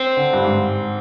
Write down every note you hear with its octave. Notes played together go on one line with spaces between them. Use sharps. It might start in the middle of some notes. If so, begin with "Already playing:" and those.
Already playing: C4
D3
G2
G#2